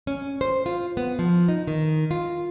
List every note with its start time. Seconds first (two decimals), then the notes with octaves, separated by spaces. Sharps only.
0.07 C#4
0.41 C5
0.66 F4
0.97 B3
1.19 F3
1.48 D#4
1.68 D#3
2.11 F4